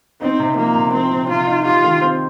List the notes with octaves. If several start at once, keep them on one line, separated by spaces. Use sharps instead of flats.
C4 D#4
C3
F3 A#3
C3
F3 C4
C3
C3 F4
D#4
F4 G4
D#3
C4